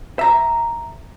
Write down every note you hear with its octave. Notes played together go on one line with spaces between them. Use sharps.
E5 A#5